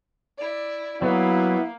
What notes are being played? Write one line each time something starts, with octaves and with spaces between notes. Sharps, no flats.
E4 D5
F#3 A#3 B3 E4